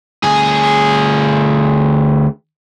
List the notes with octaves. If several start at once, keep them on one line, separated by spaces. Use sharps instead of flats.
D2 G#4